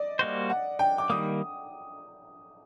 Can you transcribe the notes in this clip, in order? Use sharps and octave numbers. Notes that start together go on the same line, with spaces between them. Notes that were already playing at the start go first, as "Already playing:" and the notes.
Already playing: D5 D#5
G3 A#3 F#4 C5
F#5
G5
D6
D#3 G3 A#3 D#6